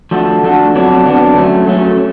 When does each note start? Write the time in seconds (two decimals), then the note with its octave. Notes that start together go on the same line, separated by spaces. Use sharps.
0.11 F3 A3 D4 F#4 A4
0.43 F3 A3 D4 F#4 A4
0.75 F2 D3 F#3 B3 D4
1.06 F2 D3 F#3 B3 D4
1.36 F#3 A3 C#4
1.67 F#3 A3 C#4